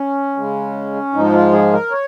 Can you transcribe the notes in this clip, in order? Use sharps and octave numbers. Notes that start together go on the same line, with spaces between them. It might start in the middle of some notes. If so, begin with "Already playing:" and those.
Already playing: C#4
C#3 G#3
G#2 F3 G#3 D#4
F4
G#4
A#4
C#5